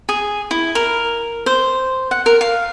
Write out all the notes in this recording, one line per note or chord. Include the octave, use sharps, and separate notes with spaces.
G#4
E4
A#4
C5
F#5
A#4
F5